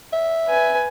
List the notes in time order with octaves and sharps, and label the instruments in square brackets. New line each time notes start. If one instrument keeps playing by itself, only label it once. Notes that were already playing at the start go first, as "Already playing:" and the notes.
[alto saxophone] E5
[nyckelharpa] B4 G#5